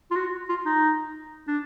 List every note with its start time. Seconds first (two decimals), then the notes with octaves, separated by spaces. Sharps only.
0.11 F4
0.16 F#4
0.49 F4
0.66 D#4
1.48 D4